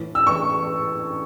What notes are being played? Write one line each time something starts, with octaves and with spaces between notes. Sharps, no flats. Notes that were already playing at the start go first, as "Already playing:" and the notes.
Already playing: A2 E3
E6
A2 E3 C#6